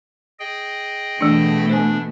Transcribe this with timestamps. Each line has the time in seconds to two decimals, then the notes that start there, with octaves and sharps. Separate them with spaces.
0.39 G#4 D#5 G5
1.21 B2 E3 A3 D4
1.69 D4 C5 G#5